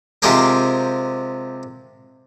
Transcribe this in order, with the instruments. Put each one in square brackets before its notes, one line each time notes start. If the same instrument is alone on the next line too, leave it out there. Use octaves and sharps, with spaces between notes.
[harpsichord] C3 F3 G#3 G4 G#4 A#4